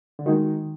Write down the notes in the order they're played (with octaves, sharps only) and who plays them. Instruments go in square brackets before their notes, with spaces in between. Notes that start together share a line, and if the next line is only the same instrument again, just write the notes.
[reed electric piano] D3
[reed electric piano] D#3 [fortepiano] G#3 D#4 F#4